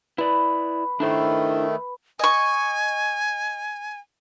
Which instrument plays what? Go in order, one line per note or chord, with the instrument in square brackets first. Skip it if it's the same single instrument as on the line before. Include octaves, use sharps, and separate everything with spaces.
[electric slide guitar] E4 D5 [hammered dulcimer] B4
[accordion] D#3 A3 [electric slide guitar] D4 E4 C5
[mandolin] D#5 C#6 [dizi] G#5